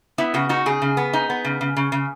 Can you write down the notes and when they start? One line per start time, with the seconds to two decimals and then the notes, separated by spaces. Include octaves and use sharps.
0.18 B3 E4
0.34 C#3 F#4
0.49 D#4 F#4
0.66 C#3 G#4
0.82 C#3
0.97 B3
1.13 D#4
1.30 B3
1.45 C#3
1.61 C#3
1.77 C#3
1.92 C#3